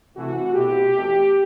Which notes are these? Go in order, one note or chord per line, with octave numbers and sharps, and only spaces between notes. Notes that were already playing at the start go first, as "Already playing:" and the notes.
C3 E3 A3 E4 F#4
B2 A3 C4 E4 G4
E2 B2 A3 C4